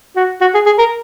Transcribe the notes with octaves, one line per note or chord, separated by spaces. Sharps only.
F#4
F#4
G#4
G#4
A#4